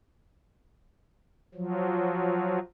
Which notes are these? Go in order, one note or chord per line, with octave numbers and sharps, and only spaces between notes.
F3 F#3